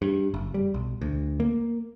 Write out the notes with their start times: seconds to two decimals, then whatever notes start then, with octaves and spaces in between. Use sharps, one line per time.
0.02 G2
0.34 F#1
0.54 G3
0.74 B1
1.01 D2
1.40 A#3